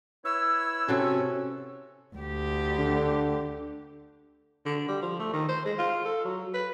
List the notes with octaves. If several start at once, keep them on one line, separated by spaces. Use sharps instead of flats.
E4 B4 C#5 E6
C3 C#4 F#4 A4
D2 G4
D3
D3
G3
F3
A3
D#3
C5
G#3
F4
A4
F#3
B4